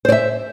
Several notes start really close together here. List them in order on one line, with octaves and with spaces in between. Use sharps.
C5 D5 E5